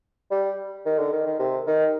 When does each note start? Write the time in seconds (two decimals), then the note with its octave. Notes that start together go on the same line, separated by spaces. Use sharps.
0.31 G3
0.86 D#3
0.98 D3
1.12 D#3
1.26 D#3
1.39 C3
1.67 D#3